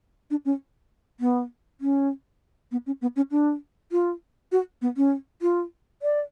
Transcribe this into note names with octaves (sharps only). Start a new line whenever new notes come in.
D4
C#4
B3
C#4
B3
C#4
B3
C#4
D4
F4
F#4
B3
C#4
F4
D5